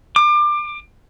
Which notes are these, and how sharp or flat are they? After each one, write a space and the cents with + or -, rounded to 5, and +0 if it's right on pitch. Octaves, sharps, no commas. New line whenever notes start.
D6 +30